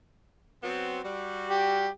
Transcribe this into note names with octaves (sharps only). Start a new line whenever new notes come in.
F#3 B3 C4
G3 F#4
G4